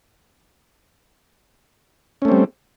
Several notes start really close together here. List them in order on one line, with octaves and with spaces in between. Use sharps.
C#4 A3 C4 G3